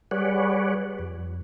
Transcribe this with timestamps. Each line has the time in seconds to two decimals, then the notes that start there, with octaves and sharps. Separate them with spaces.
0.11 G3 G#4 B4 C#5 D5 F#5
0.99 F2